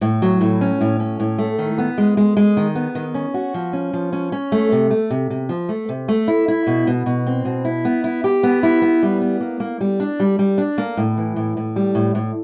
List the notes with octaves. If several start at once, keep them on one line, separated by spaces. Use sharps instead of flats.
A2
F#3
A2
C#4
A2
C#4
A2
A3
D#3
B3
G#3
G#3
G#3
D#3
B3
D#3
C#4
F#4
F3
C#4
F3
C#4
C#4
A3
C3
A3
C3
C3
F3
A3
C3
A3
E4
E4
B2
B2
B2
C4
B2
E4
B3
E4
G4
B3
E4
B3
G3
B3
A#3
A#3
G3
D4
G3
G3
D4
A#3
A2
E3
A2
A2
G3
A2
A2